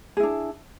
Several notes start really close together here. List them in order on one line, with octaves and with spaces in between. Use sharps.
G#4 E4 D4